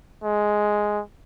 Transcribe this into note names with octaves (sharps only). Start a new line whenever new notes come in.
G#3